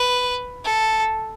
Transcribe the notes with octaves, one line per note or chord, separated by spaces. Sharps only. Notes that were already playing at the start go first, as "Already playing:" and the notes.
Already playing: B4
A4